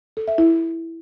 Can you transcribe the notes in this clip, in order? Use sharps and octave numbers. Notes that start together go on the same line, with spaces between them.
A4
E5
E4